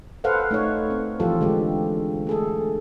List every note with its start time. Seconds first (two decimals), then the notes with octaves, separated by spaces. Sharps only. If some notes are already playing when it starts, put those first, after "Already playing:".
0.24 A4 B4 C5 F5 F#5
0.51 A3 D#4 C#5
0.90 C4
1.20 E3 F3 F4 G4 A4
1.41 D3 G#3 G4
2.27 A3 G#4 A4